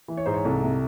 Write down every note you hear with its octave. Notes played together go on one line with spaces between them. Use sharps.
E3
C#5
G#2 C5
C#5
C2 A4
C3